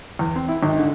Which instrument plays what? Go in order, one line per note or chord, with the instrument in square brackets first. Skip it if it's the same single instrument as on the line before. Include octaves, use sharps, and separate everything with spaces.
[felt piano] E2
C4
E4
G#1
D3